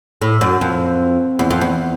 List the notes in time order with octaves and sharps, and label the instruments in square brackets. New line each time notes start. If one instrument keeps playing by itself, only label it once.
[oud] A2
F#2
F2
E2
F2
E2